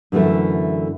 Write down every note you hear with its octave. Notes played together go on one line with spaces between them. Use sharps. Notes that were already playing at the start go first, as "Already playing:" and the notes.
F#2 D3 E3 A3 E4